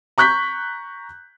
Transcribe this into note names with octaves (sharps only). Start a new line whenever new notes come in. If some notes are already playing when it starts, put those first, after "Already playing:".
A#5 C#6 F#6 G6 B6